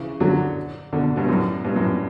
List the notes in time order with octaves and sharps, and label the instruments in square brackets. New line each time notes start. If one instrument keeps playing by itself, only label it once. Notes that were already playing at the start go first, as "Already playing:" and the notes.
Already playing: [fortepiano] C#3 E3
D3 F#3
B2 D3
G2 B2
F#2 A2
G2 B2
F#2 A2